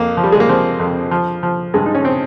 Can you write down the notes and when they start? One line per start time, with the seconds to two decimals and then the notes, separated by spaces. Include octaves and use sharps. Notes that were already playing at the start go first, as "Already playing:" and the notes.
Already playing: F2 A#3
0.17 F3
0.23 G3
0.32 G#3
0.40 A#3
0.49 F3 C4
0.79 F2
1.11 F3
1.43 F3
1.74 G2 G#3
1.86 D#4
1.95 C#4
2.05 C4